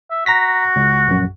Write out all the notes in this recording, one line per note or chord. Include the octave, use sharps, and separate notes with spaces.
E5
F#4 A#5 A#6 B6
C#2
A#1 F#2